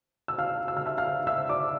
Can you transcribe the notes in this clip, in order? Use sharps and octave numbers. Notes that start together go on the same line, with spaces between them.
E6
F5 F6
E6
F6
E5 E6
F5 F6
E5 E6
D5 D6